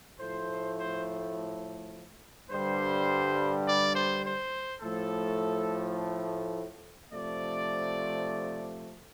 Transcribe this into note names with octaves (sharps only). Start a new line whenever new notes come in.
A2 F3 A3 C5
C5
G2 D3 G3 C5
D5
C5
C5
A2 F3 A3 A4
C3 F3 A3 D5